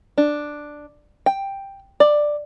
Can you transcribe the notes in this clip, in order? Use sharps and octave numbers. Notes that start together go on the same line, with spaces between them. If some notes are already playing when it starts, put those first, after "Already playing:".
D4
G5
D5